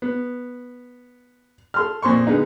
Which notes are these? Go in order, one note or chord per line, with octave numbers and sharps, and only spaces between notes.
B3
A4 C6 F6
F2 A#2 F3 C6 C#6
D3 G#3 B3 D#4